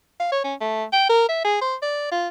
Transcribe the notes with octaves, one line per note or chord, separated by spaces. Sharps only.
F5
C#5
C#4
A3
G5
A#4
E5
G#4
C5
D5
F4